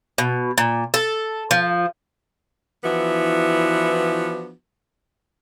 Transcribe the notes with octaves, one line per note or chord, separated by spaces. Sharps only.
B2
A#2
A4
F3
E3 F3 B3 D4 E4 F#4